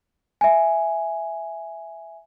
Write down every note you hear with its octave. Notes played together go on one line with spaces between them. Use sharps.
E5 G#5